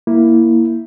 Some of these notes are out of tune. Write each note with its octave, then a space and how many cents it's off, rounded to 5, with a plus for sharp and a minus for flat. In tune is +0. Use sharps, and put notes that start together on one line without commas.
A#3 +5 E4 +0